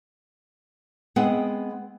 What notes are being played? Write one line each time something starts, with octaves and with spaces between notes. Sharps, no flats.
G#3 B3 C4 G#4 F#5 G5